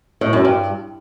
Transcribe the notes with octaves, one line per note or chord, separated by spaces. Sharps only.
A2
F#2
G2